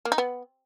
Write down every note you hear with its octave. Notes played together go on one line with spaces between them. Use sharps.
A#3
D#4
B3